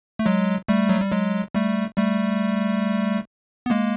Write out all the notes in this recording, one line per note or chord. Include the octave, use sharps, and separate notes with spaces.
A3
F#3 G#3
G3 A3
F#3
G3
F#3 G#3
G3 A3
G3 A3
B3
G#3 A#3